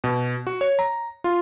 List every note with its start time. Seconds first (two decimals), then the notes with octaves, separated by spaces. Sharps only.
0.04 B2
0.47 F#4
0.61 C#5
0.79 A#5
1.24 F4